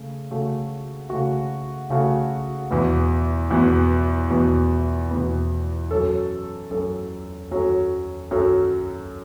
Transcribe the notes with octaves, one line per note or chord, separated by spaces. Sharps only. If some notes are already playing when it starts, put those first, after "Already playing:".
Already playing: C#3 A3
C#3 A3 F#4
C#3 A3 F#4
C#3 A3 F#4
E2 B2 B3
E2 B2 B3
E2 B2 B3
E2 B2 B3
F#2 F#3 C#4 A4
F#2 F#3 C#4 A4
F#2 F#3 C#4 A4
F#2 F#3 C#4 A4